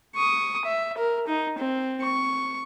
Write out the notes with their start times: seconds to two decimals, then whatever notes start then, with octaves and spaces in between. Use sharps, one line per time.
0.16 C#6 D#6
0.65 E5
0.98 A#4
1.28 D#4
1.58 C4
2.02 C#6